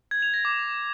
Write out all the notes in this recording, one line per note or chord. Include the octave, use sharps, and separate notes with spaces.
G#6
F7
A#6
D6